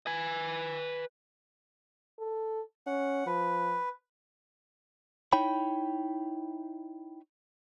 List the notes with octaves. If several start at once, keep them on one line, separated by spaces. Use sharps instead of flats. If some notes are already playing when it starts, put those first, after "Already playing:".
B4 G#5
A4
C#4 F#5
F3 B4
D#4 E4 C#5 G5 B5